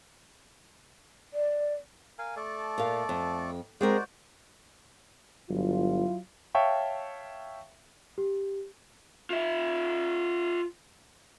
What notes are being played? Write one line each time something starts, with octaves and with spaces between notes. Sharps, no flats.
D5
A#4 F5 G#5
A3 A4 D5
A#2 F5
F2
G#3 C4 F#4 A#4 C5 D5
G1 F#3 E4 F4
C#5 E5 F5 G5 A5 C#6
G4
F4 E5